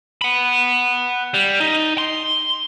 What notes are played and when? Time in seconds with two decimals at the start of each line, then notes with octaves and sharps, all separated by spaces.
0.22 F#5 B5
1.34 G3
1.60 D#4
1.98 C6